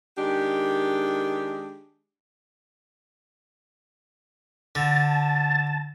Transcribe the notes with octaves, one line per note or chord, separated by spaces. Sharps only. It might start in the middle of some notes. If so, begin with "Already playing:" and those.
D#3 G#3 D4 G4
D3 A5